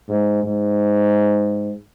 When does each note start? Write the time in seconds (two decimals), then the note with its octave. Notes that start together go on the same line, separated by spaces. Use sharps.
0.09 G#2
0.44 G#2